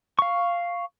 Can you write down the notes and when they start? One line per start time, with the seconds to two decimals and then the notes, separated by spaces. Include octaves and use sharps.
0.19 F5 C#6